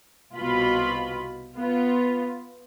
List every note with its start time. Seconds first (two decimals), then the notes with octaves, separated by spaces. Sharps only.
0.34 C2 B2 F4 B5
1.57 B3 F4